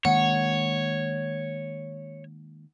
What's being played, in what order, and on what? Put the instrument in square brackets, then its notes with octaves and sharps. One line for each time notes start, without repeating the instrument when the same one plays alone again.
[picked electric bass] D#3 G#3 A#3 [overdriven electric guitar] C#5 [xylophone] F#5